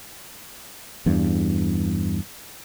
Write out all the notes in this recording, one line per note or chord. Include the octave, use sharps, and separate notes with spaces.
E2 G2